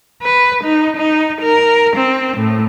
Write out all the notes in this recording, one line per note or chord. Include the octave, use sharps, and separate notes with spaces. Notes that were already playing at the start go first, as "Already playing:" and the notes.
B4
D#4
D#4
A#4
C4
A2